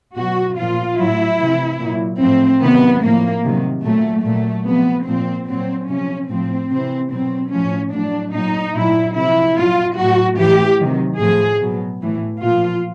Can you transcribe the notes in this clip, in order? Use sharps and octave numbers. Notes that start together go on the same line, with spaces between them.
B2 F#3 F#4
A#2 F3 F4
A2 F#3 E4
C3 E3
A#2 F#3
A2 F3 C4
C3 D#3 F#3 B3
A2 F3 A#3
C3 D#3 F#3
A#2 F#3 A3
A#2 F#3 A3
C3 F3 B3
A#2 F3 C4
A#2 F#3 C4
C3 F3 C#4
A2 F3 C4
C3 E3 C4
B2 F#3 C4
A2 F3 C#4
A2 F#3 D4
A#2 F#3 D#4
A#2 F#3 E4
C3 F3 E4
A#2 F#3 F4
A2 F#3 F#4
A2 E3 G4
C3 D#3 F#3
A2 F3 G#4
B2 F#3
A2 E3
A#2 F3 F4